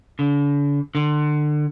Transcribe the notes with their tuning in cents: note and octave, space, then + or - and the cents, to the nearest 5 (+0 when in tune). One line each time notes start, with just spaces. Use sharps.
D3 -40
D3 +30